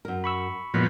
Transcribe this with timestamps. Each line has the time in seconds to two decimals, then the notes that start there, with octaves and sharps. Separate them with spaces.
0.05 F#2 A#4
0.24 B5 C#6 E6
0.74 F#2 A#2 D#3 F3 G#3 B3